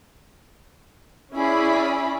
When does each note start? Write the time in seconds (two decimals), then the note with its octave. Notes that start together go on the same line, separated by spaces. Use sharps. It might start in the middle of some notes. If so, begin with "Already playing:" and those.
1.34 C#4 E4 G#4 D5 B5